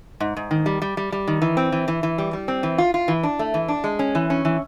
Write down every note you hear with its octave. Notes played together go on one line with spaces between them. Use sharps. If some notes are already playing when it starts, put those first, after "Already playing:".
G#2
G#2
D#3
G3
G3
G3
G3
D#3
E3
C4
E3
E3
E3
G3
G3
C4
E3
F4
F4
E3
D4
A3
E3
D4
G#3
C#4
E3
C#4
E3